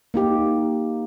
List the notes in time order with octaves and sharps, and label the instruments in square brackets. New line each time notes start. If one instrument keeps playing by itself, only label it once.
[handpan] A#3 D#4 G4